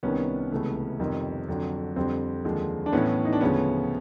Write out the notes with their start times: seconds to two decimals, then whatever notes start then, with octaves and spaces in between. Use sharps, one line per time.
0.03 C2 C3 D#3 B3 C#4
0.52 C#2 C3 E3 A3
1.00 F2 C3 D#3 G3
1.48 F2 D3 F#3
1.96 F2 D3 G3 C4
2.45 D#2 D3 F3 G#3
2.86 D4
2.93 A2 E3 A3 B3 C#4
3.25 D#4
3.33 D4
3.41 D2 C#3 F3 B3 C#4